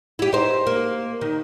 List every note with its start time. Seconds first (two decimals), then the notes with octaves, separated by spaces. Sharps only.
0.19 E4 G4
0.33 D#4 C5
0.67 A#3
1.21 D#3